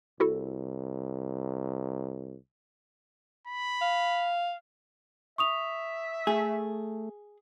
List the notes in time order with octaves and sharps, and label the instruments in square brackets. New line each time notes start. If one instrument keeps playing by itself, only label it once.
[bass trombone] C2 [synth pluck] E4 F#4 A4
[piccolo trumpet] B5
[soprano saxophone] F5
[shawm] E5 [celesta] C#6 D#6 F7
[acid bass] A3 [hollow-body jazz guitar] G#4